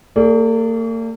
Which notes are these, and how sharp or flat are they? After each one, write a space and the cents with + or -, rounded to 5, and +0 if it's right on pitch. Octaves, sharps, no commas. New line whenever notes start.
A#3 -45 G#4 +0 D5 -15